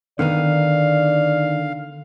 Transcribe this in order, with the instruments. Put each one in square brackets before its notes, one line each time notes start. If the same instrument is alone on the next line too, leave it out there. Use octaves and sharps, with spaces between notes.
[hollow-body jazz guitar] D3 B3 D#4 [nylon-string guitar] D#3 [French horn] D5 [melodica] F5